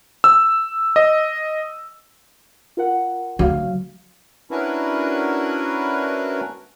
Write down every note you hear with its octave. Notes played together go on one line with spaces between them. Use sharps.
E6
D#5
F4 A#4 F#5
D2 F#3 F#4 F5
C#4 D4 E4 F#4 A#4 B4